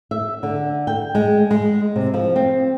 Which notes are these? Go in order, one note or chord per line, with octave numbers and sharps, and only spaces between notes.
E5
D3
G5
G#3
G#3
C3
F3
C4